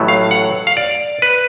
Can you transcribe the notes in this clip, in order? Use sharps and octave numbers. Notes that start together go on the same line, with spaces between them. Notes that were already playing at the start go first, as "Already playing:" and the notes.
Already playing: A1 A2 F#3 A3
F5
F#5
F5
D5
B4